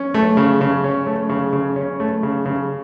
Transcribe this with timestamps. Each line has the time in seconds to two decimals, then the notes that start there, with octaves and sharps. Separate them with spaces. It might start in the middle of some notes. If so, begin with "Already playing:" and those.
Already playing: C#4
0.14 A3
0.37 C#3
0.61 C#3
0.84 C#4
1.07 A3
1.29 C#3
1.53 C#3
1.76 C#4
2.00 A3
2.23 C#3
2.45 C#3